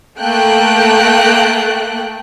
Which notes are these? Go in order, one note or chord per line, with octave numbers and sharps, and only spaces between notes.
A3 A#3 G5 F#6